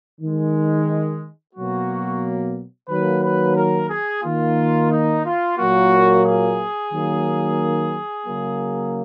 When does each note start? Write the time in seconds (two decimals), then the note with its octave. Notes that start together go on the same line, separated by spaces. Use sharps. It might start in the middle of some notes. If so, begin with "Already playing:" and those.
0.21 D#3 G#3
1.55 B2 F#3 A#3 F#4
2.89 D#3 F#3 A#3 B4
3.23 B4
3.56 A#4
3.89 G#4
4.23 D#3 A#3 F4
4.90 D#4
5.25 F4
5.58 A#2 F#3 A#3 F#4
6.24 G#4
6.92 D#3 F#3 A#3
8.26 C#3 F#3 A#3